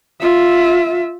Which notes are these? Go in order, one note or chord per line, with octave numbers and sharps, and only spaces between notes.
F4 E5